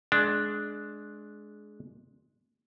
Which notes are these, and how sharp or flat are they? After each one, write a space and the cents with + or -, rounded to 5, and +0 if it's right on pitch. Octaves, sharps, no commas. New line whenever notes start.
G#3 +20 D4 +0